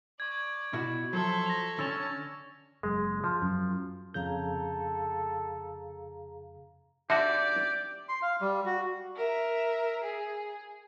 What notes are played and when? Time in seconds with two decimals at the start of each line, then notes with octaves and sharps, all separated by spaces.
0.20 D5 C#6 G#6
0.73 B2 E4 F#4
1.13 F3 F#3 A4 C5 E5
1.46 A#6 F7
1.79 D3 C#4 A5 E6 A6 F7
2.83 F#1 G#3
3.24 F3
3.42 F#2
4.14 F2 C#3 G#4 A4 F5 A#5 G6
7.10 D3 D#4 F#4 G4 D5 E5
8.09 C6
8.22 F5
8.41 G3
8.66 F#4
9.16 A#4 E5
10.04 G#4